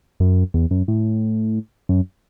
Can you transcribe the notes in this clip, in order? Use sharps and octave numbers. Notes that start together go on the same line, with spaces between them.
F#2
E2
F#2
A2
F#2